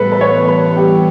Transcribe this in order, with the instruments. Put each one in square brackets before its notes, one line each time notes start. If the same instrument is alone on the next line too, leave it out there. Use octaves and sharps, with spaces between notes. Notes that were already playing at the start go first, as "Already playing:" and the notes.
Already playing: [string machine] A2 E3 G3 B3 [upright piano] A4 B4
[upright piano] B4
C#5
B4
G4